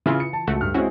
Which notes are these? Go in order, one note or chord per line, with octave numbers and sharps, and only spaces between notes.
C#3 E3 E4 F4
C#7
A5
C#2 A3 F#4
G2 F6
G#3 C4 C#4 E4 F#4